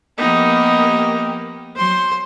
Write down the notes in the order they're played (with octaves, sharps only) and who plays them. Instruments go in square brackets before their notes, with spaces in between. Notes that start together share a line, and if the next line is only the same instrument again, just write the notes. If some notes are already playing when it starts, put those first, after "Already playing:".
[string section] F3 A#3 G4 [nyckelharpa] B3 D#4
[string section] F#3 [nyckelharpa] C5 C6